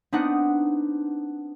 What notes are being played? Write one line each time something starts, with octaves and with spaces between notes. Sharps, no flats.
B3 C4 D4 D#4 F#5